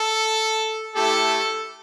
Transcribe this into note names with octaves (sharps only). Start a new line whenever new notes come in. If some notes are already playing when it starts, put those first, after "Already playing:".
Already playing: A4
A3 E4 G4 A4